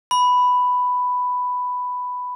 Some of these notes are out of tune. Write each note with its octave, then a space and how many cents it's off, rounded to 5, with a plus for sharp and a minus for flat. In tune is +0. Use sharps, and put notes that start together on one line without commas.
B5 +5